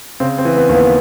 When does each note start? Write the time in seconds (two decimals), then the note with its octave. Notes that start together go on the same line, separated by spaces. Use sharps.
0.20 C#3 C4
0.38 C4
0.45 E3
0.57 B3
0.69 D#2
0.75 B3